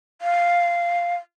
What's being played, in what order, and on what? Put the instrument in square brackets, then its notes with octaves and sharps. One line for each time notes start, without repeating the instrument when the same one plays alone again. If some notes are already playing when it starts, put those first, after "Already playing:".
[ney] F5